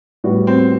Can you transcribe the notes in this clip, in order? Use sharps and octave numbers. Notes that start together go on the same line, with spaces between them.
A2 G3 B3 F#4
C4